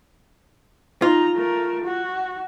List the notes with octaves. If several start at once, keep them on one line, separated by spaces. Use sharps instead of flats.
D#4 F4 A#5
A3 A#4
F#4